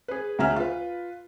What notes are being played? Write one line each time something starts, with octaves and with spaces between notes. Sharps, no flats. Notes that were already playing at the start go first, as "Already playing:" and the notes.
G#4 B4
D2 F#3 G#4 E5 A#5 F6
F4 B4